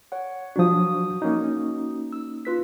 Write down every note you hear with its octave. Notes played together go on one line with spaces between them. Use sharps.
C#5 F#5
F3 F#3 D4 F#4 D#6
A#3 C#4 D#4
E6
F4 B4 B6